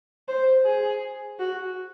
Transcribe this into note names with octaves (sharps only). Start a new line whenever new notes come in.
C5
G#4
F#4